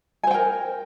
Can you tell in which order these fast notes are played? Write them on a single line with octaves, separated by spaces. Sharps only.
G#5 C5 G5 A#4